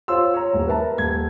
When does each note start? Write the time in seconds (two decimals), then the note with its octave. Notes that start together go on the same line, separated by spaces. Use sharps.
0.08 F4 C5 C#5 C6 E6
0.34 C#5 A#5
0.53 D#1 E3
0.66 A#4 B4 E5 A5 A#5
0.98 D#1 G#6